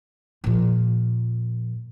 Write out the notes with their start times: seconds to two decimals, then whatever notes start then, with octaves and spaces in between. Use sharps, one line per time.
0.44 A#2 F3